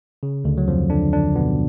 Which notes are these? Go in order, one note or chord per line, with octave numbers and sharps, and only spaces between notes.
C#3
D2 D3
F#3
F2 F3
D3 D4
D3 D4
B2 B3